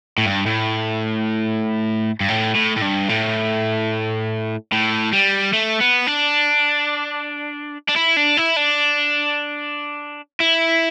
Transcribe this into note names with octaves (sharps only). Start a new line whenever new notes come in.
A2
G2
A2
G2
A2
A2
A2
G2
A2
A2
G3
A3
B3
D4
D4
E4
D4
E4
D4
E4